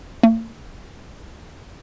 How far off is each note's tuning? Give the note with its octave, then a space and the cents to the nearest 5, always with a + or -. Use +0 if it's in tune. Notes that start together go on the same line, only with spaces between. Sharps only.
A#3 -45